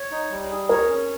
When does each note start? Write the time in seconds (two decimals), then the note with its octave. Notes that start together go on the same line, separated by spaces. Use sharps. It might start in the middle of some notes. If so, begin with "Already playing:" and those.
Already playing: C#5
0.11 D#4
0.30 G3
0.50 G#4
0.69 A#4 C#5
0.89 C#4